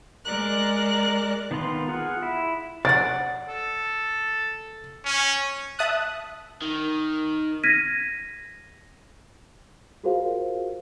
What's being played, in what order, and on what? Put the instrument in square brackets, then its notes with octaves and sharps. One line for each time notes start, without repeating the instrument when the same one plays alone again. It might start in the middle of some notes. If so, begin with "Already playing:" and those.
[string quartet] G#3 A#4 D5 A#5 F#6
[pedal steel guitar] D#3 B3 F4 A#5 C6
F4 G#4 F#5
E4
[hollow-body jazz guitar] D5 F#5 [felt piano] A6
[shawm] A4
[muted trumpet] C#4
[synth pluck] E5 A5 D#6 F#6
[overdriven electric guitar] D#3
[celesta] F6 G#6 A#6 B6 D#7
F4 F#4 G#4 A#4 C5 F5